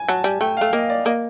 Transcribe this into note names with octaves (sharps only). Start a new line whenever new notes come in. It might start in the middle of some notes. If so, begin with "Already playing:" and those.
Already playing: G#5
F#3 A5
G3 G#5
A3 G5
F5
A3
A#3 D#5
D5
A#3 D#5